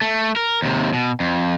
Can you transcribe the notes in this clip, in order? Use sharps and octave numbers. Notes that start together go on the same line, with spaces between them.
A3
A#4
D#2 C3
B2
F2